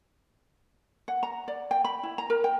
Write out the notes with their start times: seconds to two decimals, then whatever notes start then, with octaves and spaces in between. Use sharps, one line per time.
1.08 F#5
1.23 A#5
1.48 D5
1.71 G5
1.85 B5
2.03 E4
2.18 A#5
2.30 A#4
2.44 G5